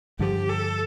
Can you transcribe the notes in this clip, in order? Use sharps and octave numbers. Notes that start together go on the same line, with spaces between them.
G2 D3 F3 G4
A4